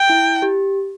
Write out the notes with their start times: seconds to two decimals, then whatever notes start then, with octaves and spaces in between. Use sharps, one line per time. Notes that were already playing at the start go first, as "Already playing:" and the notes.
Already playing: G5
0.10 E4
0.42 G4